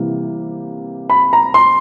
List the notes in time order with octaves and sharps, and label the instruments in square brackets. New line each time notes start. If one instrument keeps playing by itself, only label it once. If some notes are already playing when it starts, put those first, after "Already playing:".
Already playing: [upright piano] C3 E3 G3 A#3
[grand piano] B5
A#5
C6